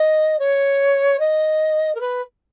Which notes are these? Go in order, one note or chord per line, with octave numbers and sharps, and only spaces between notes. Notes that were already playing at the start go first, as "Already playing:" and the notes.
Already playing: D#5
C#5
D#5
A#4
B4